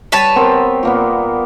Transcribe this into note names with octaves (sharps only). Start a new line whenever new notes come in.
G3 B4 C#5 A5
B3 C4 A#4
A#2 A#3 B3